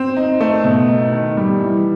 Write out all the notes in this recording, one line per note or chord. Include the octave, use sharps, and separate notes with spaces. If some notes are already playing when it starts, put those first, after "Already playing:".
Already playing: C4
D#4
A3
B2
D#4
D#3
G3
E3